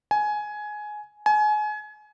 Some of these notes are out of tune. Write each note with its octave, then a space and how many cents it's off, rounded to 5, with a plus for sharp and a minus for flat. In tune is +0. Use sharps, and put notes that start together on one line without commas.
G#5 +15
G#5 +30